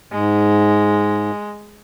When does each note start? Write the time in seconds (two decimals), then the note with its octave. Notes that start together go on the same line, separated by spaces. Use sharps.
0.12 G#2 G#3